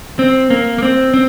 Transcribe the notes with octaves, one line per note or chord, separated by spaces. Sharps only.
C4
A#3
A#3
C4
C4